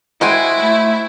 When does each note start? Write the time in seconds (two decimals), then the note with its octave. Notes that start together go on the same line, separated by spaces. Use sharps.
0.21 G#3 E4 F#4 C5 G5 G#5
0.60 A3